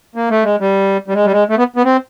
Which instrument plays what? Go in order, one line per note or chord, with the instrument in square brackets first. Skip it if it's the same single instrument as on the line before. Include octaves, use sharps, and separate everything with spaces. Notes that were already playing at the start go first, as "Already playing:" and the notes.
[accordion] A#3
A3
G#3
G3
G3
G#3
G3
G#3
A3
B3
B3
C4